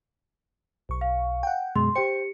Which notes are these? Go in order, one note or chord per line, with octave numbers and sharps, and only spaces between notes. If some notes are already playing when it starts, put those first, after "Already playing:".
B1 C#6
F5
F#5 G5
F#2 B2 G#3 C6
G4 C5 G5 C#7